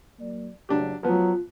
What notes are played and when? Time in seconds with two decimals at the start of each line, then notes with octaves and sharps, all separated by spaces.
0.19 F#3 A#3 D5
0.69 F#1 F#3 D4 G4
1.03 F3 F#3 B3 F4